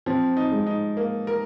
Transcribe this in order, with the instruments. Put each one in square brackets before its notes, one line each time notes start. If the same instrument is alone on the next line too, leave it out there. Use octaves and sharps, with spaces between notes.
[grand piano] F3 [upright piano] C4
[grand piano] D#4
[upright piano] G#3
[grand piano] D#4
A#3
A#4